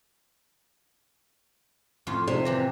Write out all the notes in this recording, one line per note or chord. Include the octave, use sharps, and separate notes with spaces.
F2 A2 F4
C3
E3 G4 A#5